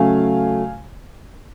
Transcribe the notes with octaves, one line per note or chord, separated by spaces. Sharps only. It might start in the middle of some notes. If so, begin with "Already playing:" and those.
Already playing: C#3 F#3 A3 F5 G#5